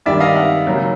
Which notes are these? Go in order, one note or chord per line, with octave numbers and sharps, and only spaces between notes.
G2 D#3 G3 D5 E5
D#5 F5
E5 F#5
C#3 F#3 A#3